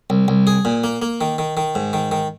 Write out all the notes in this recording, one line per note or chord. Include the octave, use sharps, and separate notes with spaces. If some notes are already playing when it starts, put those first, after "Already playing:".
C2
C2
G#4
A#2
A#3
A#3
D#3
D#3
D#3
G#2
D#3
D#3